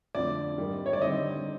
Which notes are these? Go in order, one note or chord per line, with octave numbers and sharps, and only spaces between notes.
F2 D3 F3 A3 D4 D5
G#2 D#3 G3
C#5
D5
D3 G3 C4 D#4 D#5